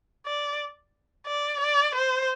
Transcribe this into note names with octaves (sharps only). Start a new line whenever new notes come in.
D5
D5
D5
C5